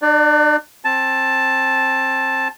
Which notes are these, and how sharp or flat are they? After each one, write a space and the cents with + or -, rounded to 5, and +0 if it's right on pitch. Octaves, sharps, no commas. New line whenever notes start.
D4 +45 D5 +0
C4 +20 A5 +0